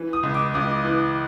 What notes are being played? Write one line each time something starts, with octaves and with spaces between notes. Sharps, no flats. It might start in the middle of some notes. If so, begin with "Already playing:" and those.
Already playing: E3
D#6
C#2
D6
C#2 D#6
E3